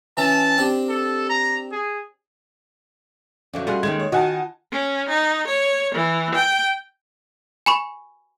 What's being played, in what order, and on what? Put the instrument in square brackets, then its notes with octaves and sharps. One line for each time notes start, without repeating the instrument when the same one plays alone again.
[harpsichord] E3 C#4 E5 [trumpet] A5
[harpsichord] C4 D4 G4
[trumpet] A4
A#5
G#4
[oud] F2 D3 F#3 [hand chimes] C#4 E5 G6
[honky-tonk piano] G3 [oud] F4 F#4 G#4 [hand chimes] A4 C6 F#6
[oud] D#2 D#3 G#3 [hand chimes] D#5 [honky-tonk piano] G#6
[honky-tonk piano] C#5
[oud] D#3 [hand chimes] F4 [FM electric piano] F#4 F#5 [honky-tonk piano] D#5 G#5 A5
[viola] C#4
D#4
C#5
E3
G5
[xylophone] G#5 B5 C#6